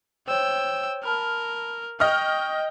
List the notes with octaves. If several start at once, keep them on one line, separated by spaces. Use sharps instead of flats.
C5 C#5 G5 E6
A#4 A5 B5 F6
D#5 G5 C#6 F6